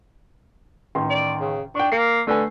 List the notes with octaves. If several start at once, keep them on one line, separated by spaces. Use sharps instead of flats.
A1 D#3 C6
D5
C#3
D4 G5 C#6
A#3 C7
D3 A3 B4 G#5